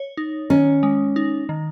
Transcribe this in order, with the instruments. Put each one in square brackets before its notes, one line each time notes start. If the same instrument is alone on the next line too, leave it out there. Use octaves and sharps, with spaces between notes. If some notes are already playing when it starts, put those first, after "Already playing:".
Already playing: [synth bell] C#5
D#4
[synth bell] D#3 [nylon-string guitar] C#4
[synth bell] G#3
D#4
D#3